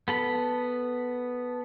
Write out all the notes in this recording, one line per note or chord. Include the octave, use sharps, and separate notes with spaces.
B3 A4 B5